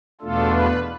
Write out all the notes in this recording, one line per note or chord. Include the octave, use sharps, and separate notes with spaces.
E2 B2 A3 D4 F4 A4
B4